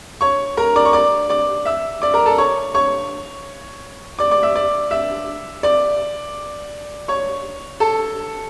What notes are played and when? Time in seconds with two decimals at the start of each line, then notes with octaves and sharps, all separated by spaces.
0.21 C#5 C#6
0.57 A#4 A#5
0.76 D5 D6
0.85 C#6
0.93 D5 D6
1.30 D5 D6
1.65 E5 E6
2.02 D5 D6
2.14 A#4 A#5
2.26 A4 A5
2.38 C#5 C#6
2.74 C#5 C#6
4.19 D5 D6
4.31 D5 D6
4.43 E5 E6
4.55 D5 D6
4.91 E5 E6
5.63 D5 D6
7.08 C#5 C#6
7.80 A4 A5